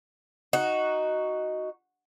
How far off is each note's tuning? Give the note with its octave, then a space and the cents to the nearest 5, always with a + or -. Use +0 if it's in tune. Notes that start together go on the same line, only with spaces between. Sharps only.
D#4 +0 F#4 +5